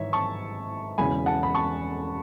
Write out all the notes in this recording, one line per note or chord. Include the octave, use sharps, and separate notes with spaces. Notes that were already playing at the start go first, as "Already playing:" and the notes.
Already playing: G#1 G#2 E3 C#5 E5
A5 C#6
E1 E2 C#3 G#5 B5
F#5 A5
B5
A5 C#6